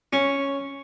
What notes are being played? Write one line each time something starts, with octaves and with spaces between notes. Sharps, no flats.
C#4